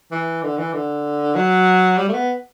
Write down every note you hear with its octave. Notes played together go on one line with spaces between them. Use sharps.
E3
D3
E3
D3
F#3
G3
A3
B3